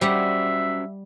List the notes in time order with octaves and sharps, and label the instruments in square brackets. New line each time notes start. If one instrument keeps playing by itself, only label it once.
[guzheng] G3 G4 F#5 [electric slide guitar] C#4 F#4 C5 [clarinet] E5